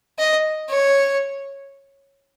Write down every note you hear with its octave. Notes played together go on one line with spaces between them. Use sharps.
D#5
C#5